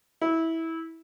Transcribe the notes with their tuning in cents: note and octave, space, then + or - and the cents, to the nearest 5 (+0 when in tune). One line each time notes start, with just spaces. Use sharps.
E4 -15